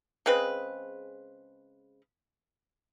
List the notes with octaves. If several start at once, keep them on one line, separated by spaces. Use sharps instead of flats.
C#3 G#3 C4 B4